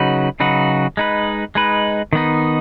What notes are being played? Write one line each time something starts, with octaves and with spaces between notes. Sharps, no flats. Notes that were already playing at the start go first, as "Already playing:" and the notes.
Already playing: C#3 F#3 D#4 F#4 B4
C#3 F#3 D#4 F#4 B4
G#3 D#4 B4
G#3 D#4 B4
D#3 B3 D#4